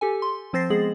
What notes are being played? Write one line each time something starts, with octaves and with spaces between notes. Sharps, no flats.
G4 A4 G#5
C6
F3 C4 C5 A6 A#6 C7
G#3 B3 G#4 F#7